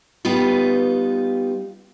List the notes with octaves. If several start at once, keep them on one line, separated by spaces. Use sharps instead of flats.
G3 B3 D#4 F4